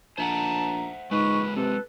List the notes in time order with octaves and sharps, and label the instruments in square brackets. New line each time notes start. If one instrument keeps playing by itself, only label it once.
[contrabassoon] A#1 [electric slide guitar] C5 E5 F#5 [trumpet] A5 [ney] A#5
[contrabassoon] G#2 [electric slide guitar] G#3 A#3 F4 [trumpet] B4 [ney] C#6
[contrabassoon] C3 [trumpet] A4 [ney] B4